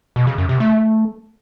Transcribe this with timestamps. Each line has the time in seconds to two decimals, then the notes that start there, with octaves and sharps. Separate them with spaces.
0.16 B2
0.27 C#3
0.38 F#2
0.49 C3
0.60 A3